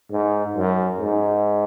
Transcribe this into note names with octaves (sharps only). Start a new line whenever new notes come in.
G#2
F#2
G#2